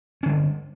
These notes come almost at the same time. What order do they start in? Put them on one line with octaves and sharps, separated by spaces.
C#4 D3 G3